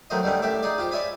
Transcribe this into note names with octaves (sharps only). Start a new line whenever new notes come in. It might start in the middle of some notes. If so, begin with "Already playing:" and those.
D#3 F#3 A3 C5 D#5
D3 D#3 G3 A3 C#4
A2 G4 E5 D6
D#4 G#4 D5
F4 G4 C5
C#5 D5 E5 G#5 B5